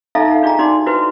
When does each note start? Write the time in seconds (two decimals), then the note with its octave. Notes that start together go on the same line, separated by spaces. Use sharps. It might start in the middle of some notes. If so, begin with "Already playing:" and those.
0.15 D#4 A4 E5 F5 A#5
0.28 D#4 F#5
0.43 D4 F4 G#4 D#5 A#5
0.59 D4 D#4 F#4 D5 C6 D6
0.86 E4 F#4 B4 C5